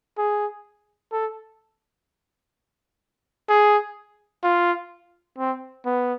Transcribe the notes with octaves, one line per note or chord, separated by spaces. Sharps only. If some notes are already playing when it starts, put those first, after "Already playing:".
G#4
A4
G#4
F4
C4
B3